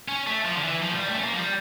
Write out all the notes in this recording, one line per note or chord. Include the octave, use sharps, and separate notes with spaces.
C#4
A3
F3
D3
E3
F3
A3
G3
A3
C#4
A#3
F3
G3